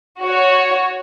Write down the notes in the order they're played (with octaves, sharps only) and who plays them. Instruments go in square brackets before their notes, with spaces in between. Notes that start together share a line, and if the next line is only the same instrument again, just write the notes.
[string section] F#4 C#5